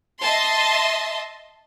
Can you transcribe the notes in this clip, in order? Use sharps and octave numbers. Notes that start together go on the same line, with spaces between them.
D#5 E5 A5 C6